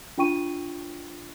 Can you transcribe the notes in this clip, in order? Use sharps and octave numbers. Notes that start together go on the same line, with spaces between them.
D4 F4 G5 C#6 D#7